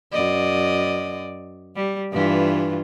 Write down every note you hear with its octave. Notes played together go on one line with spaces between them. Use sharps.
F#2 D5 D#5
G3
G2 E3 F4